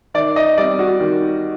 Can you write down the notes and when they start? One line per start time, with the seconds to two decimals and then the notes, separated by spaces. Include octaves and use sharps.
0.14 D#3 D5
0.36 D#5
0.57 G3 C4 D5
0.79 F#4
1.00 D#3